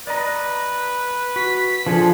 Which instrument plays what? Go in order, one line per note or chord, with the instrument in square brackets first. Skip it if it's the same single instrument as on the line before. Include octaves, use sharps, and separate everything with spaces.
[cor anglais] B4 [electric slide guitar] D5 D#5 A#5
[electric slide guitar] F#4 [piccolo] B6
[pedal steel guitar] F3 [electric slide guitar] D4 G#4 A4